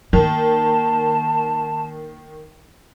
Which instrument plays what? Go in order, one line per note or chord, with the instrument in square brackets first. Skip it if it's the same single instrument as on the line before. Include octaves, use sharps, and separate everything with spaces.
[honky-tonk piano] D#3 [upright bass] A#3 [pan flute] A5